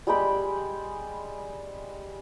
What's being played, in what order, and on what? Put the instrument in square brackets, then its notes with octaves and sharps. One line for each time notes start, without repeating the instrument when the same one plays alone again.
[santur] G3 G#3 G5 B5